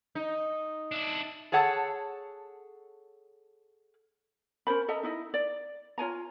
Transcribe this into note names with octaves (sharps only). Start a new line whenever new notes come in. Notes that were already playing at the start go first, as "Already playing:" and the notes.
D#4
D4 E4
G#4 A4 C#5 F#5 A5
C#4 A#4 C5 B5
A4 D#5 E5 A#5
D#4 E4 D#5
D5
F4 C#5 G#5 A#5